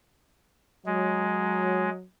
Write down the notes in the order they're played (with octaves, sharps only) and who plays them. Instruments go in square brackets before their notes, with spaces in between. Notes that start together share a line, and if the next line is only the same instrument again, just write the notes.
[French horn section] F#3 [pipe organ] G#3